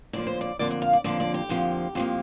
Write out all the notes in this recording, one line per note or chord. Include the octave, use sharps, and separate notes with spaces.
F2 D3 F3 A#3 D5
C5
D5
F2 D3 F3 A#3 D5
D5
F5
D5
F2 D3 F3 A#3 D5
D5
G4
F2 D3 F3 A#3
F2 F3 A#3